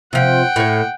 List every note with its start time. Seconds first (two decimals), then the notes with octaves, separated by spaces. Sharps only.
0.13 C3 F3 F#5 G5
0.56 A2 C#5